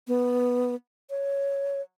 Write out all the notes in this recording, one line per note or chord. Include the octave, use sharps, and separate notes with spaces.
B3
C#5